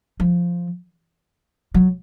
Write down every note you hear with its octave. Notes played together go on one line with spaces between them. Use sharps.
F3
F#3